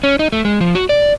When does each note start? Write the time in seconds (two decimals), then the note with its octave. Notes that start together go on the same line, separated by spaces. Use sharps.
0.04 C#4
0.19 D#4
0.32 A3
0.45 G#3
0.61 F3
0.75 F#4
0.89 D5